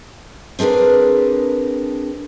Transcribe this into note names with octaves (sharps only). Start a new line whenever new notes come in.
C4 D4 G#4 A#4 B4